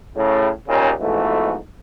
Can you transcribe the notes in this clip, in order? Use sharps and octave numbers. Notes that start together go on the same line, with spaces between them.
A2 C#3
D#2 A#2 C#3
F2 G#2 B2 E3 A3